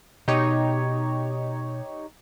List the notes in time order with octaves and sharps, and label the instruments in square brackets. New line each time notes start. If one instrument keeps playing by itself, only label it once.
[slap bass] B2 [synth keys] D#4 G4 C#5